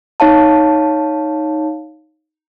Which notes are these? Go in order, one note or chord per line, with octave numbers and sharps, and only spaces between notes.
D#4 C#5 F5 A5